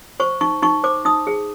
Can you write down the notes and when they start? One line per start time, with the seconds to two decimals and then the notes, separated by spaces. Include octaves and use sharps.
0.20 C5 C#6
0.41 D#4 C#6
0.62 D#4 C#6
0.83 C5 D6
1.05 D#4 D#6
1.27 G#4